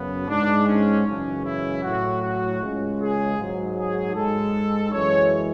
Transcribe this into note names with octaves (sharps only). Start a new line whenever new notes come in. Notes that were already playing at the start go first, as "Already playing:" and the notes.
Already playing: F#2 C#3 B3
G#2 G#3 D4
C#4
F#2 C#3 E3 G#3 C#4
E4
A2 F#3 F#4
F#4
C#2 C#3 G#3
G#4
G#2 F#3
G#4
G#2 G#3 A4
F#2 E3 G#3 C#5